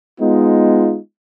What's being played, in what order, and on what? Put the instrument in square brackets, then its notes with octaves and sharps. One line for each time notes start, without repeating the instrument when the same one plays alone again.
[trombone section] G#3 B3 D#4 F4